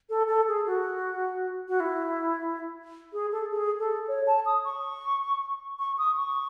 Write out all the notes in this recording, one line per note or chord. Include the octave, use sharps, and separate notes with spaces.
A4
A4
G#4
F#4
F#4
E4
G#4
A4
G#4
A4
C#5
A5
D#6
C#6
C#6
D#6
C#6